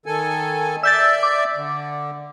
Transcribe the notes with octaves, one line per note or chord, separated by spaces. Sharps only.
D#3 A4 G#5
D5 E5 E6 G6 A6
D6
D3